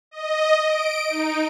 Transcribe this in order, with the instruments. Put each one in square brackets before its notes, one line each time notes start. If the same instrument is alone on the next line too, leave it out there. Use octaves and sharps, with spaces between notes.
[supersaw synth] D#5
D7
D#4